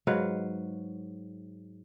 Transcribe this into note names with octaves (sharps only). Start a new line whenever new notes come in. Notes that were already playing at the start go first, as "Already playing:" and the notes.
G#2 F#3 B4 F5